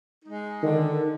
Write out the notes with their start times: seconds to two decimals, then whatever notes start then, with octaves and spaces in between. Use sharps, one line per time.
0.24 G#3 D#4
0.63 D3 D#3